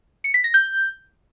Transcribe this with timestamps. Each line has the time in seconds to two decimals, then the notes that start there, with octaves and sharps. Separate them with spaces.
0.24 C#7
0.34 B6
0.44 A#6
0.54 G6